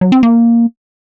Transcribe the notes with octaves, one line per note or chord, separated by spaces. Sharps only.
F#3
C4
A#3